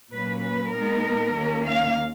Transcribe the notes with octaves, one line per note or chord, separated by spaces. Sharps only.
A#2 F#3 A#3 C#4 B4
B4
A#2 G#3 B3 D#4 A#4
D#2 D#3 A#3 C#4
F5